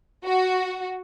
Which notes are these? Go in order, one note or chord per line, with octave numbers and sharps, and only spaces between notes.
F#4